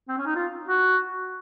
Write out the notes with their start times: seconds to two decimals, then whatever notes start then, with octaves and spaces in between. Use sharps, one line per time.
0.09 C4
0.18 C#4
0.26 D#4
0.36 F4
0.68 F#4